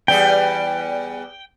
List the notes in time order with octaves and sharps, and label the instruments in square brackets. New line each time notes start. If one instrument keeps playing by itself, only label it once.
[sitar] E2 G3 G#4 [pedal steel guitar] G5